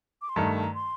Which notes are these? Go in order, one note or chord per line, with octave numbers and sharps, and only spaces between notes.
D6
C6
G2 D#3 A3 A#5
A5
A#5
C6